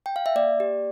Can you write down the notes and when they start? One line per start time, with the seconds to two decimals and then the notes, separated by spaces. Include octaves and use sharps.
0.06 G5
0.16 F5
0.26 E5
0.35 A#3 D5
0.60 G4